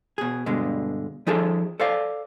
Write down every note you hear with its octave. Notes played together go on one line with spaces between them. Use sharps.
B2 G#4
G2 B2 D3 G#3
F3 D#4 G#4 A4
A4 C5 D5 F5